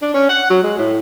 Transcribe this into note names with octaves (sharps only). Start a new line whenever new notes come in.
D4
C#4
F#5
F#3
G#3
A2